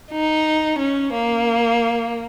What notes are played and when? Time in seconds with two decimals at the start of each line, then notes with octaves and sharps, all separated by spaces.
0.12 D#4
0.79 C#4
1.13 A#3